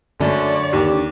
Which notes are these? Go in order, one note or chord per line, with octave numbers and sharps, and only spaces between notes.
F#2 D3 A3 C#5 D5
D#2 G4